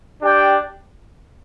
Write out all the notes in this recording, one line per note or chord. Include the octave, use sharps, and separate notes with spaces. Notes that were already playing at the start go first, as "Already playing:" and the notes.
D4 G4 D5 G5